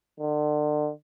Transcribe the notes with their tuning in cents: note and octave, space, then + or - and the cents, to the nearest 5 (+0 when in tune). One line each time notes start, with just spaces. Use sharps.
D3 +35